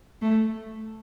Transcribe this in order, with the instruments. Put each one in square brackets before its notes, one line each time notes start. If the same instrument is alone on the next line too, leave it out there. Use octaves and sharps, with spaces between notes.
[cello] A3